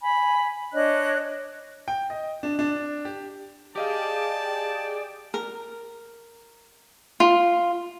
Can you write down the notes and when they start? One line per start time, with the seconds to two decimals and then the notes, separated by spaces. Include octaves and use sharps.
0.01 G#5 B5
0.73 D4 C#5 D#5 F#6
1.88 G5
2.10 D#5
2.43 D4
2.59 D4
3.05 G4
3.76 G4 G#4 D5 D#5 F5 G5 A5
5.34 A#4
7.20 F4